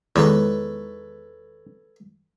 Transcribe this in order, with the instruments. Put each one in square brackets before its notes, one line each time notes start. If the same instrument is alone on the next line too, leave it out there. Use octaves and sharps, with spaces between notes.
[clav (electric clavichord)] E2 [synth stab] D#3 G#3 B3 [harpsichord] A4 B4 C#5